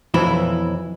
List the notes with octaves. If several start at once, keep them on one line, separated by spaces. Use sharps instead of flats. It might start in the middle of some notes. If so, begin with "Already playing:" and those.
B1 F2 E3 E4